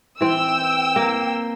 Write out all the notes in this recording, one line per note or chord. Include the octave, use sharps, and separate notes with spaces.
E3 C4 G5 E6
A#3